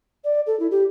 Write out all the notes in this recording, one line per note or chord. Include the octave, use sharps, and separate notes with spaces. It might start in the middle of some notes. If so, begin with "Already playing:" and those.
D5
A4
E4
G4